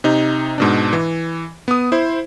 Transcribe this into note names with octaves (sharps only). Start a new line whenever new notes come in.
C3 D#4
G#2 B2 D4
E3
B3 D#6
E4 C5